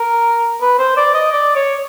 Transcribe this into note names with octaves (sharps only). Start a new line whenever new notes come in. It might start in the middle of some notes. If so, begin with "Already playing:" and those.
Already playing: A#4
B4
C5
D5
D#5
D5
C#5